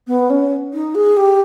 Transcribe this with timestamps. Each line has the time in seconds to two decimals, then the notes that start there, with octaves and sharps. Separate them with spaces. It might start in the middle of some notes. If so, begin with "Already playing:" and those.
0.07 B3
0.30 C#4
0.73 D#4
0.95 G#4
1.17 G4